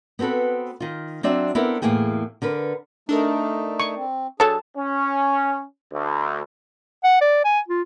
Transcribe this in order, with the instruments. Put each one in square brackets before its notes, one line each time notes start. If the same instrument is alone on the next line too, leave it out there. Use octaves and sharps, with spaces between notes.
[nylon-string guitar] B3 C4 F#4 A4 B4
D#3 F4
F#3 C4 D4 D5 E5
B3 C4 D4 E4 A4 A#4
E2 A2 D3 A#3 G#4 G5
D3 A#4 B4
[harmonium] A3 D#4 [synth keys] D4 A4 A#4
[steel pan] C#6
[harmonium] C4
[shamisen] F#3 A4 C#5 [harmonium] D4 G#4 [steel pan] A5
[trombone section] C#4
D2
[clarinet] F#5
D5
G#5
F4